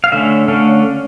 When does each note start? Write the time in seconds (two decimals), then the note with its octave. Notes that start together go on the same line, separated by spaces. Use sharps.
0.04 F5
0.12 D3 A3 C#4 E5
0.48 D3 A3 C#4 F5